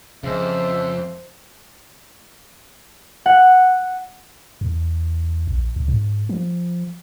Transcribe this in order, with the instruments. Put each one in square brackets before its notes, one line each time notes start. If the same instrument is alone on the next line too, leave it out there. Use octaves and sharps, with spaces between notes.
[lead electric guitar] F2 [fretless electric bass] C#3 G#3 [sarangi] C5 [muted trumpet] E5
[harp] F#5
[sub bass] E2
A#1
C#2
G#2
F3